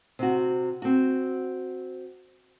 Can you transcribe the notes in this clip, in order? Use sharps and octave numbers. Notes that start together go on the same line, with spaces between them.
C3 F#4
C4 F#4